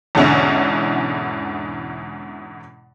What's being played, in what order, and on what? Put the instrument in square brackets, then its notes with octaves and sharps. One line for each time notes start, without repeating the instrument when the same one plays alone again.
[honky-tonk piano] E2 G#2 B2 D3 C#4 E4